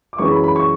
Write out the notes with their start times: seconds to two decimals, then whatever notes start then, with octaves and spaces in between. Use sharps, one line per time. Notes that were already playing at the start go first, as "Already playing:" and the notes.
0.13 D6
0.18 F#2 E3 G#3 C#4 C#6
0.31 B5
0.44 B5
0.56 C#6